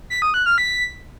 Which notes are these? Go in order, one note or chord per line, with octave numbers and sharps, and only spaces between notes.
B6
D#6
F#6
F6
B6